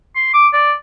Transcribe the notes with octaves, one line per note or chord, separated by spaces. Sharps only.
C6
D6
D5